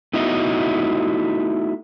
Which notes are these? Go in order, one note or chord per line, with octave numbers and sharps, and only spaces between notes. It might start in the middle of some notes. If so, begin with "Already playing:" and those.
A3 B3 D#4 E4 F#4 D#5